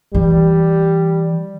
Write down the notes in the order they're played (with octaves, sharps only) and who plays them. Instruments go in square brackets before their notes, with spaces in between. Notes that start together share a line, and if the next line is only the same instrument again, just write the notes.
[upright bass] E3 [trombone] G3